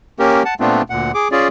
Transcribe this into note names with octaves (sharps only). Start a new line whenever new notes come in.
A#3 C#4 G4 A#4
F#5 A5
A#2 A3 B3 C4 D4 F4
D2 A#2 F#5
G#4 D6
C#4 F4 G#4 D5